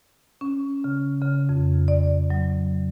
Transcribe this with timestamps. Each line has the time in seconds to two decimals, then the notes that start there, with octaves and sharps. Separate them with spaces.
0.41 C#4
0.84 C#3
1.22 C#3
1.49 F2
1.88 D5
2.30 F#3